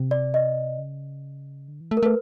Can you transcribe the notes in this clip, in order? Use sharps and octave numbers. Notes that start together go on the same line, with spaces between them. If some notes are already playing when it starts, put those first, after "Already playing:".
Already playing: C3
D5
D#5
C#3
D3
E3
A3
A#4
A3 B4